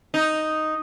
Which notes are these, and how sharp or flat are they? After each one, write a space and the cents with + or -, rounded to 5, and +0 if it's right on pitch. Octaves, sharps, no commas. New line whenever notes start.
D#4 +0